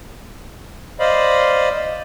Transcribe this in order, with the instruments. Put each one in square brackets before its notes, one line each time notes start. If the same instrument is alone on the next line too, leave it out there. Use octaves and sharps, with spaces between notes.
[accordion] C5 D5 D#5 F5 B5